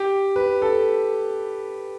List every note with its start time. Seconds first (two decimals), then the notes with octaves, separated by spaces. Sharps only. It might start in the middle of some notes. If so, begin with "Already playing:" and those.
Already playing: G4
0.36 B4
0.62 A4